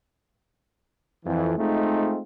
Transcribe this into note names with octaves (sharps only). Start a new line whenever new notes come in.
F2 E3
G#3 A3 C4 D#4 F4